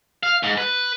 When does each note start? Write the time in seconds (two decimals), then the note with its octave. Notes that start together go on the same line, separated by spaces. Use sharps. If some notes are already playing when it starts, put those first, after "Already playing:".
0.23 F5
0.43 G#2
0.58 B4